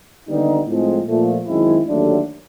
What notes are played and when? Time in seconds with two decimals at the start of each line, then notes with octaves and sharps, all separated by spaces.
0.27 D#2 D3 G3 B3 D#4
0.66 A2 F3 G#3 C4
1.06 A#2 F3 A3
1.46 F#2 D#3 G#3 C4 E4
1.85 D#2 D3 F#3 A3